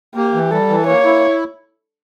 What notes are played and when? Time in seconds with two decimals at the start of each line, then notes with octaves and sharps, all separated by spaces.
0.15 A#3 G4
0.34 E3
0.51 G3 A4
0.69 E3
0.87 A#3 C#5
1.05 E4